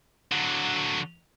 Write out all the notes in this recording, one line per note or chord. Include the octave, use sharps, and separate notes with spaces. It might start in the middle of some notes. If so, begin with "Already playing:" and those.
D3 F#3